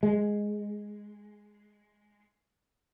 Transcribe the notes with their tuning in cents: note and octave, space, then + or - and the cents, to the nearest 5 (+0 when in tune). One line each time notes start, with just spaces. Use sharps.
G#3 +0